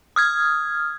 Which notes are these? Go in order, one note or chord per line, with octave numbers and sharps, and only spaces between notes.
D#6 F6 G#6